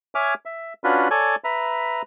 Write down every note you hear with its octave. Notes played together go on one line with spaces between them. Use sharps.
C#5 E5 G#5 D6 F6
E5
C#4 D4 F4 F#4 B4
A4 C#5 D5 G#5
B4 E5 A#5